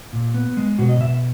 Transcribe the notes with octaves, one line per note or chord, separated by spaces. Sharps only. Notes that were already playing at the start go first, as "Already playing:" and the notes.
A#2
B3
G#3
B2 F#4
D#5
B2 E5